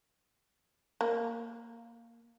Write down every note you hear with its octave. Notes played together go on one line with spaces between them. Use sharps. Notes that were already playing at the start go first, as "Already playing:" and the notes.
A#3